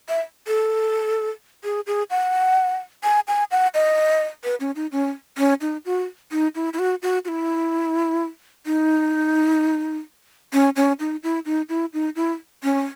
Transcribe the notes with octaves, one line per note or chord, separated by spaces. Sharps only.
E5
A4
G#4
G#4
F#5
G#5
G#5
F#5
D#5
B4
C#4
D#4
C#4
C#4
D#4
F#4
D#4
E4
E4
F#4
F#4
F#4
E4
D#4
C#4
C#4
D#4
E4
D#4
E4
D#4
E4
C#4